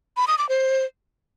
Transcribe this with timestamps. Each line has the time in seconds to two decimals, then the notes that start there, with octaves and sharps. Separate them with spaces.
0.17 B5
0.28 D#6
0.38 D6
0.49 C5